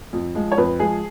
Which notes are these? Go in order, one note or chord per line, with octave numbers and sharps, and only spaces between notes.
F2
F3 G#3
C#5
F2 B4
F3 G#3 G#4